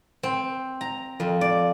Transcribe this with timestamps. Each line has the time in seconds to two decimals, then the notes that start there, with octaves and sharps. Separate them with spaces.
0.23 C4
0.81 A#5
1.20 F2
1.41 D5